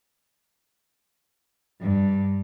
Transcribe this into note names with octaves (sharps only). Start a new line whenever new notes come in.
G2